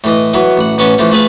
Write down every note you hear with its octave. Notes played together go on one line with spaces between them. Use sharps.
A2 E3 D#5
E3 F#3 B3
A1 F#5
A1 B3 C#4 A5 C#6
E3 F3 A3
A3 G#4 B4 F5